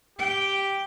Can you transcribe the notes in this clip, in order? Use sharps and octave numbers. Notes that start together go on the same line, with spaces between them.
G4 G5